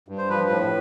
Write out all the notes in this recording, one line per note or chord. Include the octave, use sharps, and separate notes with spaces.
G2
C5
F3 B4
A2